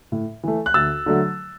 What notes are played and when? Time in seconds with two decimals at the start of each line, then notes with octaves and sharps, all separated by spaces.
0.12 A2
0.43 E3 A3
0.66 F#6
0.74 D2 E6 A6
1.06 D3 F#3 A3